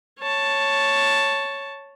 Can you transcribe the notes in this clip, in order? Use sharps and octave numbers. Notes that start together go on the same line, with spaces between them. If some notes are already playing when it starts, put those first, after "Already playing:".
C#5 A5